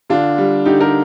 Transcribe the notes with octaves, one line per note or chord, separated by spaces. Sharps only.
D3 D4 F4
G3
D3 D#4 G4
G4 A#4